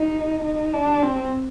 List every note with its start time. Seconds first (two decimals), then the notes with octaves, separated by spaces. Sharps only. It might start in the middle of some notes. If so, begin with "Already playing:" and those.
Already playing: D#4
0.44 D#4
0.74 D4
1.03 C4